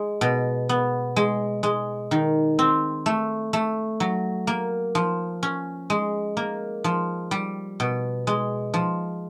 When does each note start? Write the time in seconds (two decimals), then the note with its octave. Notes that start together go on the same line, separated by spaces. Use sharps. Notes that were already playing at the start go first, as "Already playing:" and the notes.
Already playing: G#3
0.21 B2
0.69 B3
1.16 G#3
1.63 G#3
2.11 D#3
2.59 C4
3.06 A3
3.53 A3
4.00 F#3
4.47 A#3
4.95 F3
5.43 C#4
5.90 G#3
6.37 A#3
6.84 F3
7.31 G3
7.80 B2
8.27 G#3
8.74 F3